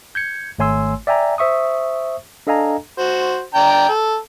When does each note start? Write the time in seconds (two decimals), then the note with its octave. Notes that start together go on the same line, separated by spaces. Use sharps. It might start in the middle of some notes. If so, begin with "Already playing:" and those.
0.15 G6 G#6 C#7
0.59 G#1 A3 C#5 G#5 C6 E6
1.07 D5 E5 G5 G#5 A#5
1.38 C5 E5 C#6 D#6
2.47 D4 A4 D#5 F5 G#5 A#5
2.98 F#4 C5
3.54 D4 G5 A#5
3.88 A4